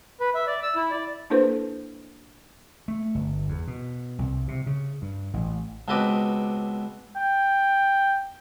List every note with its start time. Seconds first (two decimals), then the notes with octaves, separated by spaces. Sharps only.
0.20 B4
0.35 E5
0.47 D5
0.63 E6
0.76 E4
0.91 D5
1.30 A#3 D4 E4 A4 B4 C5
2.88 A3
3.15 G1
3.49 E2
3.68 B2
4.19 C2
4.48 C3
4.67 C#3
5.02 G2
5.34 A1
5.88 C#2 B2 C4 B4 D#5 D6
7.16 G5